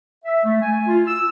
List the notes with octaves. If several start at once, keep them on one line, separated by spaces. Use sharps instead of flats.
E5
A3
G#5
F4
E6